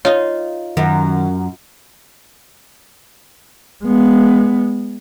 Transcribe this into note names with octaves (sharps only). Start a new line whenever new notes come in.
D#4 F4 C#5
F#2 D#3
G#3 B3